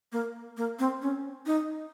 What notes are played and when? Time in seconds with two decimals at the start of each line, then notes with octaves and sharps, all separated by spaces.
0.12 A#3
0.57 A#3
0.79 C4
1.02 C#4
1.46 D#4